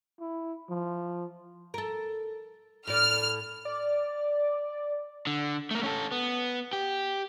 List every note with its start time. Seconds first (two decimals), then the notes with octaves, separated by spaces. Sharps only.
0.20 E4
0.69 F3
1.74 A4 A#4
2.87 A2 D5 F6
3.65 D5
5.27 D3
5.71 A3 A#3
5.83 C#4 A4
6.12 B3
6.73 G4